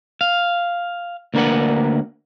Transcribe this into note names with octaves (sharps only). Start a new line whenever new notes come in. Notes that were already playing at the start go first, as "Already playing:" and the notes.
F5
D2 A#3 D4 A#4 B4 F#5